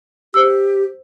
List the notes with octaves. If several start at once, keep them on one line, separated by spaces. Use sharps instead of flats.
G4 C5 E6